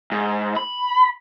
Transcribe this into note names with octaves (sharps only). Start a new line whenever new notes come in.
G#2
B5